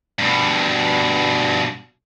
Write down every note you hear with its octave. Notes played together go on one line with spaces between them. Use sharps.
G2 B2